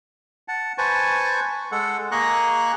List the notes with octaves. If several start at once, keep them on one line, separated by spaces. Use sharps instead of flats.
F#5 A5
B4 C5 G#5 A5 C#6
G#3 A4 F#5
A#3 G#4 D#5 A#5 C#6 F#6